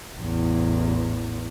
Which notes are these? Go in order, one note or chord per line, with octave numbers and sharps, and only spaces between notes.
A1 E2